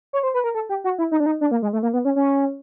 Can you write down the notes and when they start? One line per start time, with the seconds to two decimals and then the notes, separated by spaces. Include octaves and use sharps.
0.13 C#5
0.23 C5
0.34 B4
0.44 A#4
0.55 A4
0.69 G4
0.84 F#4
0.98 E4
1.11 D#4
1.20 D4
1.26 D#4
1.41 D4
1.51 A#3
1.62 G#3
1.73 A3
1.83 A#3
1.93 B3
2.05 C#4
2.16 C#4